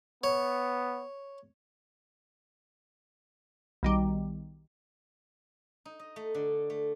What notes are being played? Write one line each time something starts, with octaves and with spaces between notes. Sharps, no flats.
B3 C#5
B1 D#3 G3
D#4
D#5
A3
D3
A3